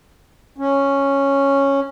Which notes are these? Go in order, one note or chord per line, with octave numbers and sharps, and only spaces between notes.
C#4